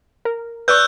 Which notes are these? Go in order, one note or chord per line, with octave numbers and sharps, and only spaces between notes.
A#4
B4 D5 C#6 E6 F#6 G6